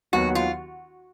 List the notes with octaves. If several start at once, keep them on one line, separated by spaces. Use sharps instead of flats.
D#2 D#3 F#3 B3 F#4
F4